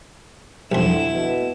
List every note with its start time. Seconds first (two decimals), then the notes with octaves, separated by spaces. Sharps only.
0.72 B1 F2 D3 E4 E7
1.12 B2